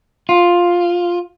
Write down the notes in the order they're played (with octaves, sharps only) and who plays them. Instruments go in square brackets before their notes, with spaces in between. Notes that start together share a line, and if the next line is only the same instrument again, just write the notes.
[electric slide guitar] F4